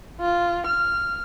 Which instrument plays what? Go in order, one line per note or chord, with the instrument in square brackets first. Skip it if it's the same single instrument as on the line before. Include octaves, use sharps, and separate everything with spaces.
[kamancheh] F4
F6